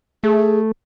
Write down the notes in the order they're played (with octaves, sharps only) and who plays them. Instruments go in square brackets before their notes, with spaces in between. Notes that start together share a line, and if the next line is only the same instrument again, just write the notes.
[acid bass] A3 [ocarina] G#4